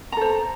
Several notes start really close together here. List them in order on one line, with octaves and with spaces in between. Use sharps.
A#5 A4 C5